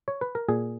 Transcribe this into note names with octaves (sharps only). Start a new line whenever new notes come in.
C#5
B4
A#4
A#2 G#4